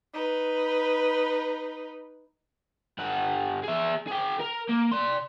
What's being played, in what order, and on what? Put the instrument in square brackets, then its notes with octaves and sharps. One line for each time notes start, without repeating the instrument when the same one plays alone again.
[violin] D#4 B4
[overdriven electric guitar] G2 F#5
G#4 E5
G#4 G5
A#4
A#3
D5 C6